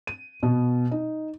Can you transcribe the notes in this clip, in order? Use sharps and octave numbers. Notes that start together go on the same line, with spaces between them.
D#7
B2
D#4